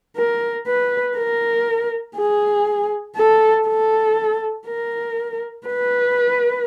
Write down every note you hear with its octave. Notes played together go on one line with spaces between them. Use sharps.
A#4
B4
A#4
G#4
A4
A4
A#4
B4